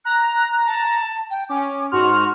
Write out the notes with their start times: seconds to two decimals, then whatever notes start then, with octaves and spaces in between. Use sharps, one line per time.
0.05 A#5 F#6
0.67 A5
1.30 G5
1.49 C#4 D6
1.92 G#2 F#4 C6 F6